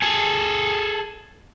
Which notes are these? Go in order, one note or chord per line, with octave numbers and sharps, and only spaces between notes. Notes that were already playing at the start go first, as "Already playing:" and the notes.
G#4 A4